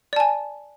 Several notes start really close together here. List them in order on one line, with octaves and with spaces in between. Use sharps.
D5 A5 G#5